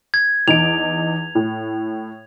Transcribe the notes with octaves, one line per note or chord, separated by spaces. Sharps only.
G#6
E2 D#4 D7 F7
A2